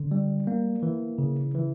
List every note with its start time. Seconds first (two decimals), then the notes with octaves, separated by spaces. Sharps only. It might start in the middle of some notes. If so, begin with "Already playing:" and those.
Already playing: D3
0.11 G3
0.47 A#3
0.83 E3
1.18 C#3
1.54 E3